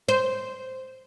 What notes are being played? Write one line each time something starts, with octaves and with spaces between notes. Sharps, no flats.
C5